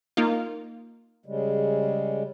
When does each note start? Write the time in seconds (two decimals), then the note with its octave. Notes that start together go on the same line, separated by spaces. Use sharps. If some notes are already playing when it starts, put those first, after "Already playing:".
0.17 A#3 D#4 F4
1.26 C#3 G3 G#3